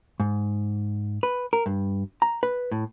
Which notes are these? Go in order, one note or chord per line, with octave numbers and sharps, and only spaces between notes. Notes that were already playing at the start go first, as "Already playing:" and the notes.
G#2
B4
A#4
G2
A#5
B4
A2